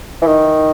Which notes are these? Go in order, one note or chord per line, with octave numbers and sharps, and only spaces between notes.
E3
D#3